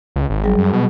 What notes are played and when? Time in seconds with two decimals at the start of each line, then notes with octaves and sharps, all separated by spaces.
0.16 C#2
0.30 G#1
0.44 F#3 G3 G#4
0.58 F#2
0.73 B2